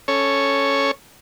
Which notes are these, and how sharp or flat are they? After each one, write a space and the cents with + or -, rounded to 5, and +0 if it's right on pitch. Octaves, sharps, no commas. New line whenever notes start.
C#4 +0 A4 +0 C#5 +0